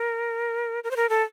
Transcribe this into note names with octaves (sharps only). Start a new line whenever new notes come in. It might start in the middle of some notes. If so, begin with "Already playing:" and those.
Already playing: A#4
A#4
C5
A#4
A4